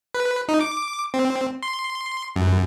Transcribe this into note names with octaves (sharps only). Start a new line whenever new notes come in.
B4
D#4
D6
C4
C6
F#2